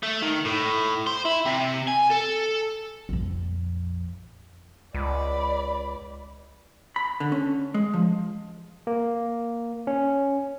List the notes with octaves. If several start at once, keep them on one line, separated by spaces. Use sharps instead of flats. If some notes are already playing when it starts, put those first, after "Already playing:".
A3
D#3
A2
C5
E4
C3
G#5
A4
A#1 F2
C#2 D5 B5
B5
D3
C#4
G#3
F3
A#3
C#4